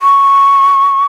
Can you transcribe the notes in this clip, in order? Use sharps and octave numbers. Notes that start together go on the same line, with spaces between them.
C#6